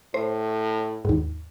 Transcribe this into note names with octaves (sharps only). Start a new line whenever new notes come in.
A2 C5
D#2 G#2